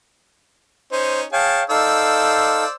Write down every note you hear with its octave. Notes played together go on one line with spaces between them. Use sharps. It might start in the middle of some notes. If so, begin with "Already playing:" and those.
C#4 D#4 C5
G#4 C#5 F5 G5 A5
D#4 A4 C5 D5 F5 E6